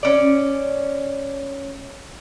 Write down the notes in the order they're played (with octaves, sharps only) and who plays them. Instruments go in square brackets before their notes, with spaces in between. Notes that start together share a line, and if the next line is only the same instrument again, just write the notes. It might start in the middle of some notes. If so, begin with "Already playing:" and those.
[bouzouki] C#4 D5